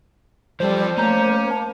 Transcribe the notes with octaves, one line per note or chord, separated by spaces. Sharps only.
F3 G3 A4 C5
A3 A#3 C#4 A#5 G6
A5